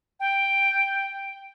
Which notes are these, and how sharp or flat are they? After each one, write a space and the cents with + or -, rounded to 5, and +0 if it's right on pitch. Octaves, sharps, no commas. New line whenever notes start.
G5 +5